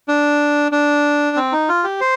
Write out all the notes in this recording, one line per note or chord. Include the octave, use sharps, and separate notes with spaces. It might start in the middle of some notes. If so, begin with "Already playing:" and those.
D4
D4
C4
D#4
F4
G4
C5